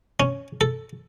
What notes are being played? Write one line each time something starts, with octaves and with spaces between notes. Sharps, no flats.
C#4
A4